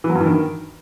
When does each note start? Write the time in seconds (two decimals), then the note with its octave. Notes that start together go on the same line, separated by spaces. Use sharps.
0.04 E3
0.10 F#3
0.15 G2
0.21 E3
0.26 D#3